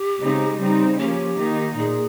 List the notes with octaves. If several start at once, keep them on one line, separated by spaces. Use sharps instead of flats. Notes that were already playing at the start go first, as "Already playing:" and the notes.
Already playing: G4
C#3 G#3 C4 D#4
C#3 G3 C4 D#4
F3 A#3 C#4 G4
D#3 A#3 D#4
A#2 G#4